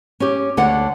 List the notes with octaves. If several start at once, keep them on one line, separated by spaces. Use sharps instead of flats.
C#4 G4
D2 D3 C#5 F#5